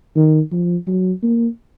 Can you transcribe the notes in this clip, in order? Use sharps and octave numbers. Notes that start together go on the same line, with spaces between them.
D#3
F3
F#3
A#3